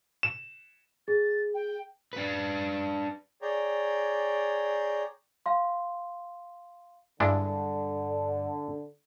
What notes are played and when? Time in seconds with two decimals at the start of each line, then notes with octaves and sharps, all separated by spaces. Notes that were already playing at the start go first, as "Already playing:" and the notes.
0.23 E7
1.08 G#4 A6
1.54 G5
2.13 D4 B4
3.42 G#4 C#5 D5 G5 A#5
5.46 F5 C6
7.20 G2 D3 G#3 D4 E4